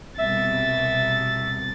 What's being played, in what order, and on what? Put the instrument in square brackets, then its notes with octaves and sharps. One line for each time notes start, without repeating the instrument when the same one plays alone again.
[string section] C2 B2 [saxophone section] E5 [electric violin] A6